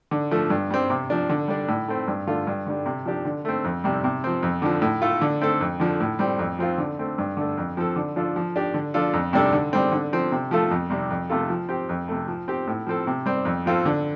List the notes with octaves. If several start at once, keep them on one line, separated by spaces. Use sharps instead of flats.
D3
F3 A3
G2
G3 C4
C3
F3 D4
D3
G3 D4
A2
A3 C4
G2
D3 A3 F4
G2
D3 G3
C3
F3 D4 G4
D3
A3 C4
F2
C3 G3
C3
F3 C4
F2
D3 F3
A2
A3 F4 A4
D3
A3 C4 A4
F2
D3 F3
A2
G3 C4
F2
F3 C4 F4
D3
A3 C4
G2
D3 A3
F2
F3 C4 A4
D3
F3 D4 F4 A4
F3
D4 G4
D3
F3 D4 F4 A4
F2
C3 G3 D4 A4
D3
G3 C4
D3
F3 C4
C3
F3 A3 F4 A4
F2
C3 G3
F2
C3 A3 F4 A4
F3
C4 G4
F2
C3 A3
F3
C4 G4
A2
F3 C4 A4
C3
G3 C4
F2
F3 C4 F4 A4
D3